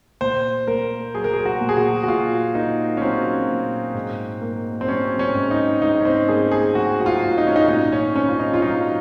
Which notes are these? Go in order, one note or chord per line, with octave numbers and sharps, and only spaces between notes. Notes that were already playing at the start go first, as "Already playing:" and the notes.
A#2 C5
A#3 A#4
F#3 G#4
A#4
G#4
F#4
A#2
G#4
F#4
F#4
A#2 F4
A#3 D#4
C#4
F#3 C4
A#2
G#2
A#3
C4
F#3 C#4
C#4
G#2
D#4
G#2 D#4
C#4
C4
A#3 G#4
G#4
F#3 F#4
F#4
F4
G#2
D#4
C#4
D#4
A#2 D#4
C#4
C4 C#4
F4
D#4
F4
F#3 D#4